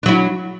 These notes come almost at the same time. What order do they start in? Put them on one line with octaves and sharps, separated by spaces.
D4 F#3 E4